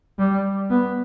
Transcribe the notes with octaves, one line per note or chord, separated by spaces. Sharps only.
G3
B3